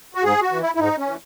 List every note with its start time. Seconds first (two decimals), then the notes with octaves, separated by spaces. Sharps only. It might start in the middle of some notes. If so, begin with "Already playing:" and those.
0.15 F#4
0.23 G#2 G#4
0.42 F#4
0.51 E3
0.61 E4
0.75 E4
0.79 G#2 D#4
0.98 C#4
1.07 E3